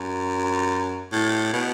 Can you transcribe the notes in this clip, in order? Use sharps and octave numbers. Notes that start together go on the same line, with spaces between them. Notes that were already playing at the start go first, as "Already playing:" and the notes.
Already playing: F#2
A2
B2